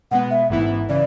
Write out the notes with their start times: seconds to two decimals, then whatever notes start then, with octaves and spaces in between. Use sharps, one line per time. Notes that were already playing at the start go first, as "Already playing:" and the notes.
0.11 B2 G#3 B3 F#5
0.31 E5
0.49 A1 G#2 E3 B3 E4
0.89 C#3 E3 D5